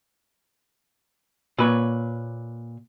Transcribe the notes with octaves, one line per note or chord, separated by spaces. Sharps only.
A#2 B4 C#5